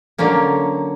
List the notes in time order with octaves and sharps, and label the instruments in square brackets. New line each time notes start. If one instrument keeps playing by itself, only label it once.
[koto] D3 F#3 A#3 C#4